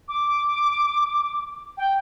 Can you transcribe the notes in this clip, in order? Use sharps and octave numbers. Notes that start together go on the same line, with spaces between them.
D6
G5